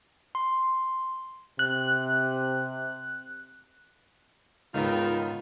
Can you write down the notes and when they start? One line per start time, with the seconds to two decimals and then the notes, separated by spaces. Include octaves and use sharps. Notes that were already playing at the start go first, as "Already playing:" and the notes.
0.35 C6
1.59 C3 F#6
4.74 C#2 G#2 D#3 B3 F4